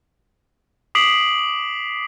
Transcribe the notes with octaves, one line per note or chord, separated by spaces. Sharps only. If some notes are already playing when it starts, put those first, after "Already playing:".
D6 D#6 B6 C7 D7 F#7